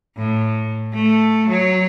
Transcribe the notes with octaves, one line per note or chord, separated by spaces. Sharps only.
A2
A3
F#3 C#5